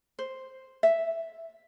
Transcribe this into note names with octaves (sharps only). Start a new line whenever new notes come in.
C5
E5